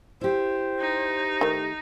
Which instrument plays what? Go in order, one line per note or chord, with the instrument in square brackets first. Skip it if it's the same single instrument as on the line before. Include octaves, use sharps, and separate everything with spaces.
[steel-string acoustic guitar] E4 G4 [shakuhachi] C5
[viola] D#4
[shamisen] D#3 A3